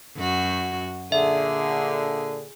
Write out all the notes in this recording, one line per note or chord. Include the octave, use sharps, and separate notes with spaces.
F#2 F#4
A#2 D3 G#4 E5